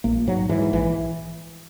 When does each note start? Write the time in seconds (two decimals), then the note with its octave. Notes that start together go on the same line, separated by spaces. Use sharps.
0.04 A#1 A#3
0.27 G#2 F#3
0.49 G#2 E3
0.73 A#1 E3